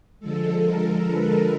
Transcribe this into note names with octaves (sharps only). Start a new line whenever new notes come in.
D3 F3 G#3 A4
A#4
B4